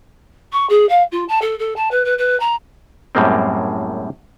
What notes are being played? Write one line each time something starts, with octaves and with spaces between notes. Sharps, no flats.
C#6
G#4
F5
F4
A5
A4
A4
A5
B4
B4
B4
A#5
F#2 A2 G3 G#3 A#3 C4